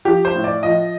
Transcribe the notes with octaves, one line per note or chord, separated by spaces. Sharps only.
F3 G4
C5
A2
D5
F3 D#5